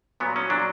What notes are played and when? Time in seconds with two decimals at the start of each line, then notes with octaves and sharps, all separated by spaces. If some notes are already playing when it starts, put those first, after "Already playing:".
0.20 A#2 F#3 B3
0.36 C#4
0.50 A#2 F#3 D4